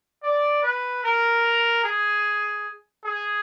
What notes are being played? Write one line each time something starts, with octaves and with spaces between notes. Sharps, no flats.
D5
B4
A#4
G#4
G#4